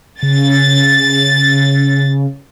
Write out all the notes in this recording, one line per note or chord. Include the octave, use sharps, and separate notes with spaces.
C#3 A6